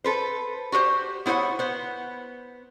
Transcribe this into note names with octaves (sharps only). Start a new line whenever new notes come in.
A4 B4 C5
F#4 G4 B4 C5
B3 E4 C5 C#5 F#5
B3 C5